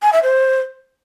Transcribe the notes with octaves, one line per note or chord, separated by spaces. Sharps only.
G#5
E5
C5